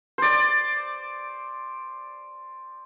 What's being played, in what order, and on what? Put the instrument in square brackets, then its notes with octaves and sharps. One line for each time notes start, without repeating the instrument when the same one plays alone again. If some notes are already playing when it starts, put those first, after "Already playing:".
[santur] C5 D5